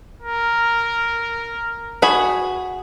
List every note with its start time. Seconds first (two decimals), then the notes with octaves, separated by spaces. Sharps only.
0.22 A#4
2.02 F#4 G#4 B5